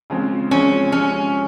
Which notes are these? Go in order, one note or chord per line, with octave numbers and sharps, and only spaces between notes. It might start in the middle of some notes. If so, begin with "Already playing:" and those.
C#3 F3 G#3 C4
C#3 F3 G#3 C4 C#4
C3 F3 G#3 C#4